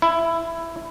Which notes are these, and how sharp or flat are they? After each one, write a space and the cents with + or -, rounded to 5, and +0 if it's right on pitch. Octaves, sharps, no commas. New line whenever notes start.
E4 +10